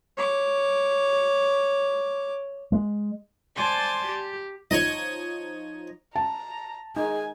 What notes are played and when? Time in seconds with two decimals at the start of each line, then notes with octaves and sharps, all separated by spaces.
0.17 C#5 D6
2.72 G#3
3.55 C5 D5 G#5 A5 C6 D6
4.07 G4
4.71 F3 D#4 C#5 D#5
6.16 A5 A#5
6.96 D#4 G#4 G#5